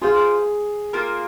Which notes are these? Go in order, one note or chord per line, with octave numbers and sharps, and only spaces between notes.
F4 G#4 C5 F5
A#3 F4 A#4